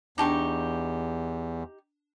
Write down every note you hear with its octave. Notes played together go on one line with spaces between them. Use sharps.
E2 D4 D#4 G4 A5 C#6 D6